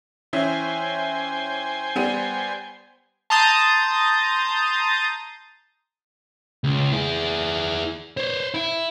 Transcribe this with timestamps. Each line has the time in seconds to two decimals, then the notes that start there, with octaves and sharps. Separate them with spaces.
0.33 E3 C#4 C5 E5 G5 G#5
1.96 G3 B3 D#7
3.30 A5 A#5 C6 D#6 G6 A6
6.64 C#2
6.93 E4 G#4
8.17 C5 C#5
8.54 E4 E5